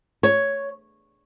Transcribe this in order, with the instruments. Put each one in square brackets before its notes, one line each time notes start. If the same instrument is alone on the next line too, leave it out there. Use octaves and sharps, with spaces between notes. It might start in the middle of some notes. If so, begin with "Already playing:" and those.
[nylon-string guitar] C#5